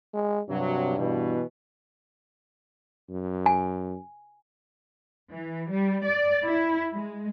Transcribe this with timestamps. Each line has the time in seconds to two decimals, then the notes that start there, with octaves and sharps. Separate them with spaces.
0.14 G#3
0.49 G2 C3 F#3
0.96 B2 E3
3.09 F#2
3.46 G#5
5.31 E3
5.71 G3
6.04 D5
6.44 E4
6.93 G#3